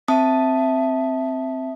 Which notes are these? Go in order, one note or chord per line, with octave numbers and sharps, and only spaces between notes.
C4 E5 A5 D#6